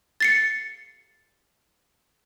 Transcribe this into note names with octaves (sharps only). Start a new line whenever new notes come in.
A6 C7 C#7